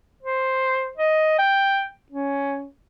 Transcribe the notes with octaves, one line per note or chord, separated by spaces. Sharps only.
C5
D#5
G5
C#4